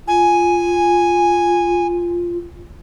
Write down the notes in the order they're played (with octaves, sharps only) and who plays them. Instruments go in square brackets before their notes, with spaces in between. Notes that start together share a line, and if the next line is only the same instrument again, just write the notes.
[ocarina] F4 [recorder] G#5